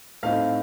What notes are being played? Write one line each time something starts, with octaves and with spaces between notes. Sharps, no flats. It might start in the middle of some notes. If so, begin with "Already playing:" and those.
A2 A3 C4 D#4 F5